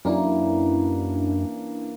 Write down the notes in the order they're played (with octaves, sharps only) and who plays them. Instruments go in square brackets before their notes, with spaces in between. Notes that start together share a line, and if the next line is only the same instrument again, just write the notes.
[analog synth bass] F#2 [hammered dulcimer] E3 A#3 [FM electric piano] C#4 D4 E4